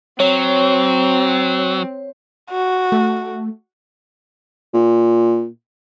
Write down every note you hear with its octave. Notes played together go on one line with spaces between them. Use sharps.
F#3 C4 C#5
F#4
A3
A#2